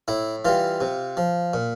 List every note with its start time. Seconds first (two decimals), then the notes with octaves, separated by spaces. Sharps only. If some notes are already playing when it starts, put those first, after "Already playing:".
0.08 A2 E4
0.45 E3 G3 F4
0.81 C3
1.17 F3
1.54 A#2